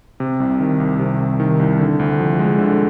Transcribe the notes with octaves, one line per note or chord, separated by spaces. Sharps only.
C3
C2
D#3
C2
C3
C2
D#3
C2
D3
D2
F3
G#3
D3